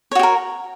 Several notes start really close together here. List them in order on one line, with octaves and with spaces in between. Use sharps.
C#5 F#4 G4 A#4